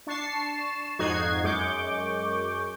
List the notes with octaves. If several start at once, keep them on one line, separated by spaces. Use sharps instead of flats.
D4 C#6 A6 C7 E7
F2 G#2 D#4 F#4 G#6 C7
F#2 G#3 C#6 D6 G6